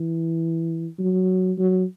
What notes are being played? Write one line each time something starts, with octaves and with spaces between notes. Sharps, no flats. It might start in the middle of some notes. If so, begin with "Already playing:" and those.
Already playing: E3
F#3
F#3